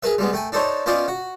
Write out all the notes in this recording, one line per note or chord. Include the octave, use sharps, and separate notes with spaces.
G#4 A#4 B4 E5
G3 G#3 B3
A3 G5 G#5
D4 D#4 A4 C5 C#5
B3 C#4 F4 C5 D5 D#5
F#4